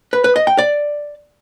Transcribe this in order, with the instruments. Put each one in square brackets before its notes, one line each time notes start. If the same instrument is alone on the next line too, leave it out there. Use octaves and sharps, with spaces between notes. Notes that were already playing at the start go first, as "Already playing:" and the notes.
[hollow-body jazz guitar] B4
B4
D#5
G5
D5